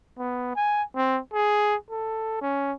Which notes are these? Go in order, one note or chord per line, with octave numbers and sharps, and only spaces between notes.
B3
G#5
C4
G#4
A4
C#4